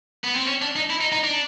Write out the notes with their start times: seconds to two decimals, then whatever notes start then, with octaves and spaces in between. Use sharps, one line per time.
0.24 B3
0.35 C4
0.47 C#4
0.62 D4
0.76 D#4
0.90 E4
1.01 D#4
1.12 D#4
1.24 D4